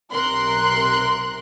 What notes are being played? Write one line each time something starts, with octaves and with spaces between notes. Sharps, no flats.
B1 C3 A#4 C6 F#6